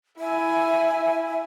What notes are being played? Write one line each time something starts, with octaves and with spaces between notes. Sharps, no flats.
E4 E5 G#5